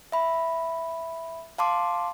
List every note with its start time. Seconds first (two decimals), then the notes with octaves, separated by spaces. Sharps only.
0.12 E5 B5
1.58 F5 A5 C6 D6